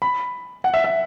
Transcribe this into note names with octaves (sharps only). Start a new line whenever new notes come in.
B5
F#5
E5
E5